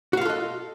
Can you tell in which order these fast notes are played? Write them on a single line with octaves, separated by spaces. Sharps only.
F#4 F5 F4 A4 D#5